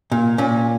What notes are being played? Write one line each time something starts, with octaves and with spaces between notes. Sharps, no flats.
A#2
A#2 C#4